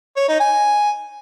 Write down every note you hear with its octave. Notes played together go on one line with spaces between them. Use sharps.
C#5
D#4
G#5